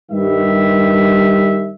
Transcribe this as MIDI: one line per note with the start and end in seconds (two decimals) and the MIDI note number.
0.11 1.72 43
0.11 1.72 51
0.11 1.72 55
0.11 1.72 76